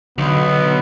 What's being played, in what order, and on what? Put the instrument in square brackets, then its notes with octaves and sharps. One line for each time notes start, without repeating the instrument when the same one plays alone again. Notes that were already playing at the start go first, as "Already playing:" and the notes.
[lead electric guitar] B1 [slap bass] D3 [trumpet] B3